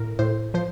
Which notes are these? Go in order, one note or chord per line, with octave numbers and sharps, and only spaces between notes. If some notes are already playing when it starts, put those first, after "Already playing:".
Already playing: A2 A#4
A2 C5
F3 C5